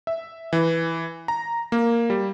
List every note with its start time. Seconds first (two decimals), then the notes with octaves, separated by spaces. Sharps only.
0.07 E5
0.53 E3
1.28 A#5
1.72 A#3
2.10 G3